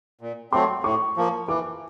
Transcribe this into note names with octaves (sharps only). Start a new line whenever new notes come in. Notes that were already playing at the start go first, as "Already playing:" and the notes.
A#2
F#3 A3 C4 C6
A2 C#6
F3 A#3
E3 D6